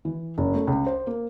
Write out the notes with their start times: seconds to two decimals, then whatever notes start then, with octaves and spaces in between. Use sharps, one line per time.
0.05 E3
0.38 F#1
0.55 A3
0.67 C#2
0.87 C5
1.07 A#3